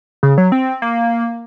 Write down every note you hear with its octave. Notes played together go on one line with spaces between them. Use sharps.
C#3
F#3
C4
A#3